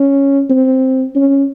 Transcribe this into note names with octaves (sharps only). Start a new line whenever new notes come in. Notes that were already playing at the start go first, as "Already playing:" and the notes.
Already playing: C#4
C4
C#4